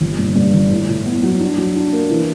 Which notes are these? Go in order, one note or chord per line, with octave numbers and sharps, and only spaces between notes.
G1
G2
G2
G1
A2
A2
B3
F#3
D4
F#3
D4
A#3
E3